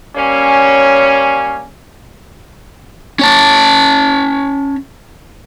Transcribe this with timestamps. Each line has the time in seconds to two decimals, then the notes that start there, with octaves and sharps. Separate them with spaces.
0.16 G3 A#3 C#4
3.19 C#4 C#5 A5